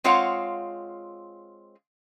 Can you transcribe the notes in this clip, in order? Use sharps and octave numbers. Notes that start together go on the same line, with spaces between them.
G#3 C4 F4 C#5 F5 F#5